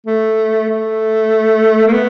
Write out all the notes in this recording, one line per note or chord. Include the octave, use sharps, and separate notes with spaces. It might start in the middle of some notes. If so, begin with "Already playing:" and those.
A3
A3
A#3
B3